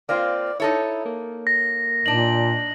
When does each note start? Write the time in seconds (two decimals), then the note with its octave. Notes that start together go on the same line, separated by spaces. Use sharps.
0.09 A#3 C4 F4 D5
0.60 D#4 E4 A4 C#5
1.05 A#3
1.47 A#6
2.06 A#2 D4 D#4 F#7